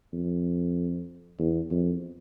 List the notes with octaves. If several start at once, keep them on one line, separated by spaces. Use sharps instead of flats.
F2
E2
F2